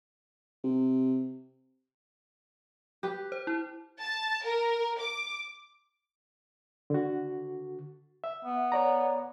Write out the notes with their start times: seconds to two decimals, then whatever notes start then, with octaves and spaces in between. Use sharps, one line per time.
0.64 C3
3.03 G4 B4
3.32 C5
3.47 E4
4.01 A5
4.44 A#4
5.00 D6
6.90 D3 F#4
8.24 E5
8.45 B3
8.72 C#5 D5 A#5